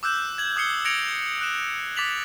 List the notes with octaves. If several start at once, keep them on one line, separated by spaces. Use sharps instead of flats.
D6 E6 F#6 G6 E7
G#6 F#7
D#6 G6 C7 C#7 G7
G#6 A#6 C#7 D7 F7
F#6 E7
D6 A6 B6 F7 F#7